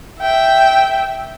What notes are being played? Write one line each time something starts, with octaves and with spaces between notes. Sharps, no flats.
E5 G5